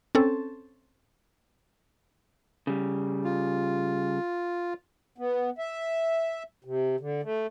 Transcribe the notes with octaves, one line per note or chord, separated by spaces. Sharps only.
C4 C#4 A4
C#3 G3
F4
B3
E5
C3
D3
A3